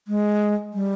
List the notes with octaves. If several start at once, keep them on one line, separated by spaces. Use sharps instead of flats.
G#3
G3